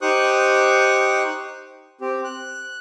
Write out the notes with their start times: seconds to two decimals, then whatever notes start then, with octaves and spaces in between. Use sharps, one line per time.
0.02 D#4 G4 C5 C#6 D#6 F#6
2.01 C4 G4
2.24 F#6